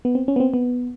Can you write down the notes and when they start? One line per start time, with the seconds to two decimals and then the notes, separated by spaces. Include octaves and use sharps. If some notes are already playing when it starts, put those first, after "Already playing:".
0.05 B3
0.15 C4
0.28 C#4
0.36 B3
0.40 C4
0.54 B3